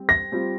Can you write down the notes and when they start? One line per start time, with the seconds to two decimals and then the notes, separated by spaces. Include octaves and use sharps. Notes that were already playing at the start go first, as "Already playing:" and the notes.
Already playing: G3 C4
0.09 A#6
0.32 G3 C4 F4